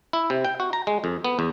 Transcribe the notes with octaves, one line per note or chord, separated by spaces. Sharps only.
E4
C3
G5
F#4
A#5
G#3
F2
B3
E2